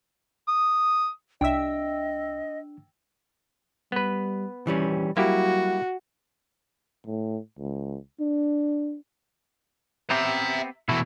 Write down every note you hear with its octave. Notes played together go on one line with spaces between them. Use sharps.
D#6
C2 D4 D#5 E5 G5 E6
G3 B3 B4
D#1 E3 G3 C#4
F#3 G3 A#3 E4 F#4 G4
A2
C#2
D4
B3 C4 G4 E5 A#5
B2 E3 A3 E4